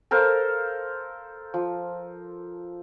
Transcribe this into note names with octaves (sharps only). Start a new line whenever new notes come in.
A4 A#4 C5 F5
F3